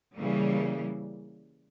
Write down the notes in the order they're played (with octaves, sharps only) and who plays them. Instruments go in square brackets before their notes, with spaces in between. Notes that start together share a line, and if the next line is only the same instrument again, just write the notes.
[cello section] C#3 E3 G3 A#3